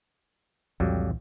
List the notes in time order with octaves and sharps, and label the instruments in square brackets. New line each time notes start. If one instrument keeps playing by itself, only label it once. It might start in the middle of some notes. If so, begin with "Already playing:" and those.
[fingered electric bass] C2 A#2 E3 [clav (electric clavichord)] F2 F#3 G3